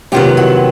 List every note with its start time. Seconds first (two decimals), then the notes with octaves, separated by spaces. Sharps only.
0.12 F2 C3 D#3 F#3 B3 F4 G4
0.37 E4 F#4